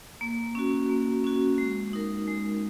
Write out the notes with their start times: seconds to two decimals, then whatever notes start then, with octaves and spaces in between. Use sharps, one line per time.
0.21 A#3
0.55 C#4 F#4
0.89 A#3
1.24 C#4 F#4
1.58 G#3
1.93 D#4 A#4
2.27 G#3